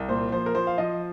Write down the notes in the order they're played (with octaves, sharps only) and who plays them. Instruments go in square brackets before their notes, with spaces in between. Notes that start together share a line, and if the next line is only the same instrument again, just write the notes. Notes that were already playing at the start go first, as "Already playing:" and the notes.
Already playing: [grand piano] C2
A#2 C5
F3 C5
A#4
F3 C5
F5
F3 D#5